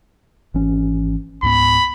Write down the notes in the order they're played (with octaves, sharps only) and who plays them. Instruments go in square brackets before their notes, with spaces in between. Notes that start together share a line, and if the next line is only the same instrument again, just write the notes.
[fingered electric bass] G#1 E3 C#4
[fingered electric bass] C#2 G#2 B3 [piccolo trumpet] B5